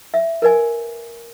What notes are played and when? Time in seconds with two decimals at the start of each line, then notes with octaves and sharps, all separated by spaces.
0.14 E5
0.42 A#4 B4 D5 G#5